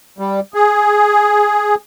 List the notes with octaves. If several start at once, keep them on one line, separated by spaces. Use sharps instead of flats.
G3
G#4